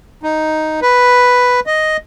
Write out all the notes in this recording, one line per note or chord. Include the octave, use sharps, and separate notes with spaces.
D#4
B4
D#5